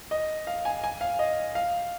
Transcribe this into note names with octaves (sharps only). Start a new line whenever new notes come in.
D#5
F5
G#5
G#5
F5
D#5
F5